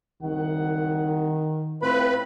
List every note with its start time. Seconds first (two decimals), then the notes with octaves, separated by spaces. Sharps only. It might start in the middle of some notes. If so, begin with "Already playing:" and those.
0.22 F#1 C2 D#3 F#5
1.82 A2 C4 F4 B4 B5